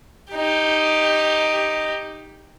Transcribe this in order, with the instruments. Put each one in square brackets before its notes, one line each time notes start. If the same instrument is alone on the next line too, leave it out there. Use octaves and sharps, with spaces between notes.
[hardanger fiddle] D#4 G4